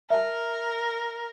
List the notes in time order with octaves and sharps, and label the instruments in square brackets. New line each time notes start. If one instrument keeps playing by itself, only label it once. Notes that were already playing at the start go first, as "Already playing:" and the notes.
[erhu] A#4 [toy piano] E5 A5